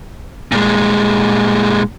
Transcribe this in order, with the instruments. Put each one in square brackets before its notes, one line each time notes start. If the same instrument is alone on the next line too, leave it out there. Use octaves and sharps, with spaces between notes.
[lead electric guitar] A#2 G#3